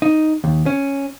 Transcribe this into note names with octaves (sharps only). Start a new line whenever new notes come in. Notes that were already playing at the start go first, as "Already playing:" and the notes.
D#4
D#2
C#4